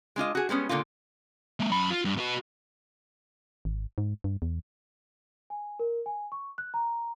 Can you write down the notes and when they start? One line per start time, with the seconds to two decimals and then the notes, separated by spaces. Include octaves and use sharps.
0.16 G#3 D4 F4 D#5
0.35 F#4 G#4
0.49 G3 G#3 B3 C#4
0.69 A#2 D3 F3 A#3 F4
1.60 G#3 A#3
1.72 F#2 B5
1.90 F4
2.05 G2
2.18 B3 F#4
3.65 G#1
3.98 G#2
4.24 G2
4.42 E2
5.50 G#5
5.79 A#4
6.06 G#5
6.32 C#6
6.58 F#6
6.74 A#5